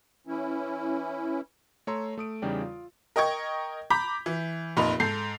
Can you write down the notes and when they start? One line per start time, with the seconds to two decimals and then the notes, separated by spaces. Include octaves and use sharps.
0.27 E3 C#4 E4
1.87 A3 C#5 A#5 C6 E6
2.18 A3 D#6 D7
2.42 E2 C#3 G3 D#4 D5 G5
2.61 F4
3.16 A#4 D#5 G5 C#6 G#6
3.90 A#5 B5 D6 G6 B6
4.26 E3
4.77 F1 A#2 F3 D#4 B5 F7
5.00 G#2 A4 G6 C7